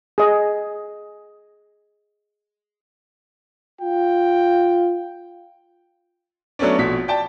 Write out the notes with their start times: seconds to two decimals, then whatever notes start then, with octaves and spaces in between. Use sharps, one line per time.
0.18 G#4 D#5
3.81 F4 G5
6.59 F#3 A3 B3 C#4 D4
6.78 A#1 B2 B6
7.08 D5 G5 A5